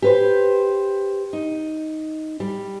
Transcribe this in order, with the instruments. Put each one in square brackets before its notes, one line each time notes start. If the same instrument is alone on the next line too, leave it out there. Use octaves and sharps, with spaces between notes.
[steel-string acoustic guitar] G4 B4 C5
D#4
G3